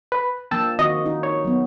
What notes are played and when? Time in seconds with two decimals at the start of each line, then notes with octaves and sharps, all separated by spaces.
0.12 B4
0.51 F3 A#3 D4 G5 A5 E6
0.79 D#3 C4 F#4 D#5
1.06 D#4
1.23 C#5
1.45 F#3 B3